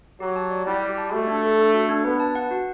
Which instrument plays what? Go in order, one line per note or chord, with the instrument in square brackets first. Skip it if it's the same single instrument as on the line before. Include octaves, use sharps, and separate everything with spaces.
[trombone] F#3 [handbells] G4
[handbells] A5
D5
[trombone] G3 [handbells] E4
[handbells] G4
A5
[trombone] A3 [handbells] F#4
[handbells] D4
A4
D4
F#4
D4
[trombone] B3 [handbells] B4
[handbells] A5
F#5
F#4